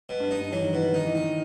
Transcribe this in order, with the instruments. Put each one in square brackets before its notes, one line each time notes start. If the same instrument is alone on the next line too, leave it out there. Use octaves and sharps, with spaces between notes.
[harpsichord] B2
[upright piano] G2
[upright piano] G2 [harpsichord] D#4
[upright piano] G2
[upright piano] E3 [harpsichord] F#3
[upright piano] D#3
[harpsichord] B2 [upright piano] E3
[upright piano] D#3
[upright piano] D#3 [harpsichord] D#4
[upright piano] E3
[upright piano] D#3 [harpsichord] D#4